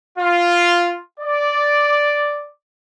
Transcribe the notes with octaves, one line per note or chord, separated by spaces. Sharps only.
F4
D5